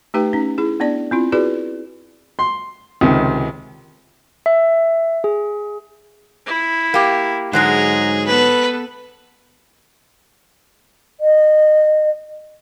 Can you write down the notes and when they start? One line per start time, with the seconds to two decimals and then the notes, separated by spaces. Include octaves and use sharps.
0.14 A3 D#4 G4 B4 G5
0.33 C#4 D#4
0.58 E4 G#4
0.80 B3 D4 D5
1.11 C4 E4 F4
1.32 E4 F#4 G#4 B4 D5
2.39 C6
3.01 C#2 C3 D#3
4.46 E5
5.24 G#4
6.46 E4
6.94 A#3 G4
7.53 G#2 D3 F#3 G#3 G#4 A#5
8.27 B3 A4 B4
11.20 D#5